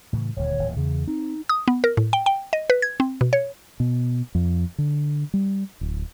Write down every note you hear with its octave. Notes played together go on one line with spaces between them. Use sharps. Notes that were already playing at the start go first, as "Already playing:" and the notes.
A2 C#3 E3
D#1 D2 C#5
D1 A#2 E3
E2 C#3
C4 D#4
D#6
B3
A#4
A2
G5
G5
D#5
B4
G#6
C4
B2
C#5
B2
F2
D3
G3
D1